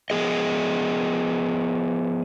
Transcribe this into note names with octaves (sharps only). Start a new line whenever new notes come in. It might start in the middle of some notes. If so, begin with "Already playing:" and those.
F3 B3 G#4 D#5